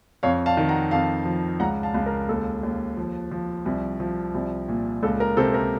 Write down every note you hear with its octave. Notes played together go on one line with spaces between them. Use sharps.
F2 C#5 F5
F5 A5
D#3
F#5 A#5
F2 F5 A5
F3
C#2 F#5 A#5
F5 A5
C#2
A#4
D#2 A4
D#2
F3
F3
C2
F3
C2
A#2
C#2 A4
A#4
C3 A4 C5
A#4